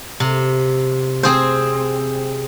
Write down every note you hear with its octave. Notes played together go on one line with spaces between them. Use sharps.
C3
C4 G#4 C5